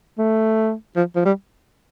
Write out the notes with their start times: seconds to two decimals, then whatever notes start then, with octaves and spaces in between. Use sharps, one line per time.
0.18 A3
0.96 F3
1.15 F3
1.25 G3